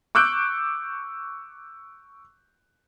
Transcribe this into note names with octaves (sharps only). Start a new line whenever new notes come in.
C#6 D6 E6 F#6 G6 D7